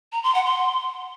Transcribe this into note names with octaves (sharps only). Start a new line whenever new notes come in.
A#5
C6
F#5
C6